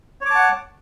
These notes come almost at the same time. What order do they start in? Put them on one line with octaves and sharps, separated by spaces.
C#5 D6 A5 F#5